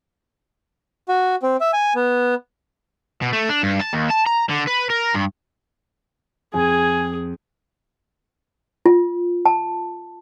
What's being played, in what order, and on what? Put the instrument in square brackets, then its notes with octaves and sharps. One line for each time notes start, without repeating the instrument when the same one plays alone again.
[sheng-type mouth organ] F#4
C4
E5
G#5
B3
[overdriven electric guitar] B2
A3
D4
G2
A5
D#2
A5
A#5
D3
B4
A#4
G2
[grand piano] F2 [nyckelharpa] G#4 [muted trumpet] G#5
[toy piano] F4
A5